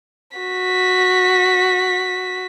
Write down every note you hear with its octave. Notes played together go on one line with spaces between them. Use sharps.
F#4 B6